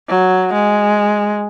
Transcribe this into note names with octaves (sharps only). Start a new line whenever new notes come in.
F#3
G#3